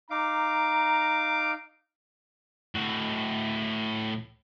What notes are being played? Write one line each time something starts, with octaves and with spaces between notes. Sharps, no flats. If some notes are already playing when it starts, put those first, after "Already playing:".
D#4 F5 A#5 D6
A2 F#4